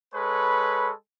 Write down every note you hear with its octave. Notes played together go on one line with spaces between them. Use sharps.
G#3 A4 B4 C#5 B5